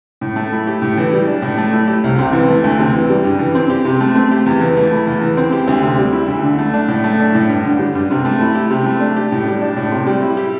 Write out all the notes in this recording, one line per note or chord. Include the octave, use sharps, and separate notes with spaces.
A2
A3
E4
G4
A2
E3
G3
D4
A2
A3
E4
G4
C2
C3
E3
A3
D2
C3
E3
G3
G2
E3
C4
G4
C3
A3
C4
G4
E2
E3
A3
E4
E2
E3
C4
G4
D2
C3
G3
E4
D2
D3
A3
D4
A2
A3
D4
A2
G2
D3
G3
G2
C3
A3
E4
G4
C3
A3
D4
G4
A2
G3
D4
A2
C3
G3
E4
G4